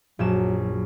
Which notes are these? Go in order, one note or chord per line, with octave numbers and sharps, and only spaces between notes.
A#1 F#2 F#3 E7